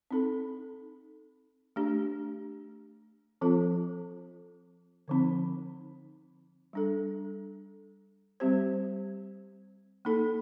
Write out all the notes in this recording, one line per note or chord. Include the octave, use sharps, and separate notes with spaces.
C4 D#4 A4
A3 D4 G4
F3 C4 F4 A4
D3 F3 C4 D#4
G3 D4 A4
G3 C4 G4 C5
A#3 D#4 A4